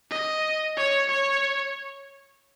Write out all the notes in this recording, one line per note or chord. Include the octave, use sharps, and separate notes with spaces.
D#5
C#5
C#5